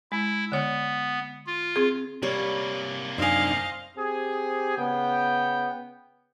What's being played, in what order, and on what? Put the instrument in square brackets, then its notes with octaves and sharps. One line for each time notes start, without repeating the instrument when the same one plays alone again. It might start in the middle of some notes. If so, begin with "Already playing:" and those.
[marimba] G#3 [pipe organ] E4
[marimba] D3 C#5 [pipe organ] B3
[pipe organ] F4
[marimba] C4 G#4
[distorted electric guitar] C3 A#3 [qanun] G3 C#5
[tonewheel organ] F#2 D4 D#4 [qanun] C5 G#5 [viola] D#5 F5
[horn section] C4 G4 G#4
C#3 B3 G5